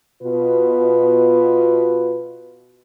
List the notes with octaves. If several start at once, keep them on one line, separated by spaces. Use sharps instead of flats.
B2 F4 B4